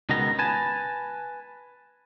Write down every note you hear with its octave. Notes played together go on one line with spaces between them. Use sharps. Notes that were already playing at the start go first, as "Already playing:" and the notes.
C#2 B2 D#3 B3 A#5
B4 G#5 A5